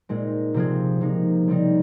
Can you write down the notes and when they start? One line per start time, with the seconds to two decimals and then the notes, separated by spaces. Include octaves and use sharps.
0.09 A#2 G#3 C4 D#4
0.54 C3 F3 C4 F4 G#4
1.01 C3 F3 A#3 D#4
1.47 C#3 G3 C4 D#4